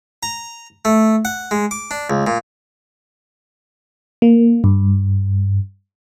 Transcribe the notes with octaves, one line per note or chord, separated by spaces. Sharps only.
A#5
A3
F#5
G#3
D6
D4
C#2
A#2
A#3
G2